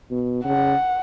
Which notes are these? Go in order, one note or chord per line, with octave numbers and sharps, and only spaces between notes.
B2
C#3 F#5